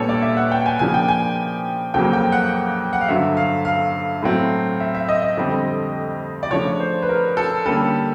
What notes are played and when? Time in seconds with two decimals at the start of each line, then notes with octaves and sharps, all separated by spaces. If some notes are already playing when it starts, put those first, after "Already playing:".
Already playing: A#2 G3 B3 D4 A4 C#5
0.09 D5
0.22 E5
0.37 F#5
0.52 G5
0.66 G#5
0.79 C#3 F3 A#3 D4 G#5
0.94 G5
1.08 G#5
1.94 F2 C#3 F#3 A#3 G5
2.13 G5
2.32 F#5
2.93 F#5
3.01 F5
3.08 G2 D3 F#3 E5
3.37 F5
3.65 F5
4.22 A2 F#3 A3 C4
4.80 E5
4.95 E5
5.09 D#5
5.22 D#5
5.37 F2 D3 G3 C4
6.43 D5
6.51 C#3 F3 A3 D4 C#5
6.80 C5
7.02 B4
7.09 A#4
7.37 A4
7.65 D3 G3 A#3 C#4 A4